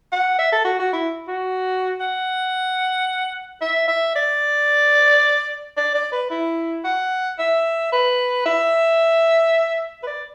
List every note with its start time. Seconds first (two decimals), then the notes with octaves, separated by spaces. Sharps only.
0.12 F#5
0.39 E5
0.52 A4
0.65 F#4
0.79 F#4
0.93 E4
1.27 F#4
2.00 F#5
3.61 E5
3.88 E5
4.15 D5
5.77 D5
5.94 D5
6.12 B4
6.30 E4
6.84 F#5
7.39 E5
7.92 B4
8.46 E5
10.03 B4
10.07 D5